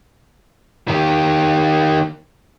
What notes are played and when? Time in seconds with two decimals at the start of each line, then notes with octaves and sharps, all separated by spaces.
0.88 D#3 G4